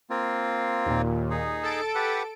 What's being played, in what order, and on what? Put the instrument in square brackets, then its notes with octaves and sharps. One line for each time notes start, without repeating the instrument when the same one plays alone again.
[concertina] A#3 C4 F4
[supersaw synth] D#2 A#2
[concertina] D#4 G#4
[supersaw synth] A4 A5 D7
[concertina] G4 B4 F#5